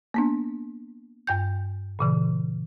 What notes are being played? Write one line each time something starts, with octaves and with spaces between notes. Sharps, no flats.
A#3 B3 D4
G2 G5 G6
A#2 C#3 E3